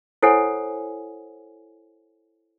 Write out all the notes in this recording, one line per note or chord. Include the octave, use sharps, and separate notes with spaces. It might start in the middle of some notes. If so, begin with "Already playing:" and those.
E4 A4 C5 C#5 F#5 G#5